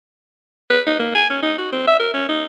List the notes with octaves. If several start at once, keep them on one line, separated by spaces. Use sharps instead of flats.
B4
D#4
A#3
G#5
C#4
D#4
F#4
C4
E5
A#4
C#4
D#4